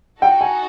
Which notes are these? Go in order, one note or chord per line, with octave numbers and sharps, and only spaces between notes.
D#4 F#4 A4 G5
G#5